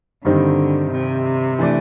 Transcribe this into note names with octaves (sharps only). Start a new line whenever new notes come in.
G2 D3 D#3 G3 C4 D#4
C3
E3 A3 D4